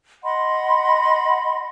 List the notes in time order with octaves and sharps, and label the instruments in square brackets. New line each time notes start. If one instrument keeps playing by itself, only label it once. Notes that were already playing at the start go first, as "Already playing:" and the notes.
[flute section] D#5 F#5 B5 C6